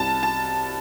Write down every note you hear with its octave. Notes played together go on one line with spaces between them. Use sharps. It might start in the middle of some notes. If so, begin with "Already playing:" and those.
Already playing: C2 A5
A5